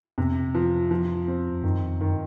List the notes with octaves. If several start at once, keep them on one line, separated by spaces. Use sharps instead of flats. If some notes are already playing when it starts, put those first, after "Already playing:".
F2 C3
F3
F3
C4
F#2 D#3
F2
F#2 D#3